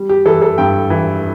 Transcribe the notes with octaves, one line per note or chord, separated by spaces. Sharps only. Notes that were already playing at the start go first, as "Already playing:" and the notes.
Already playing: G3
G4
E3 A4
A4
G2 G5
E3